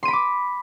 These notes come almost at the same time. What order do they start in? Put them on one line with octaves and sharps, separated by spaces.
C6 D#7 B5 D7 D6